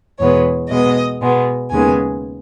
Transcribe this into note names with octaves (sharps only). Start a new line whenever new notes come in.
E2 B2 G#3 B3 C#5
B2 G#3 B3 D#5
B2 G#3 B3
D#2 C#3 G#3 B3 G#5